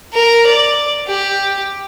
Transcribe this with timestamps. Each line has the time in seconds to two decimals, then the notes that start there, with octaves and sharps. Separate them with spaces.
0.13 A#4
0.47 D5
1.08 G4